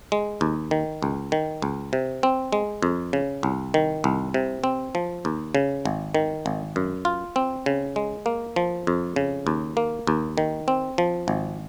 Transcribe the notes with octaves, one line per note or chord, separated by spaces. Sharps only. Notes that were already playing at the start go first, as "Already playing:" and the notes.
G#3
D#2
D#3
C#2
D#3
C#2
C3
C4
G#3
F2
C#3
C2
D#3
C2
C3
C4
F3
D#2
C#3
G#1
D#3
G#1
F#2
F4
C4
C#3
G#3
A#3
F3
F2
C#3
D#2
A#3
D#2
D#3
C4
F3
G#1